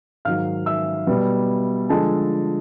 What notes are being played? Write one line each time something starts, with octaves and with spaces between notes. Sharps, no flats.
G#2 D#3 F#3 F5 F6
E5 E6
B2 G3 B3
D3 F3 G#3 A4 A5